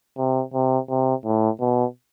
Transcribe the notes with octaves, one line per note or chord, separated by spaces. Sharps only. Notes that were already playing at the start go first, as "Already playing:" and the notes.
C3
C3
C3
A2
B2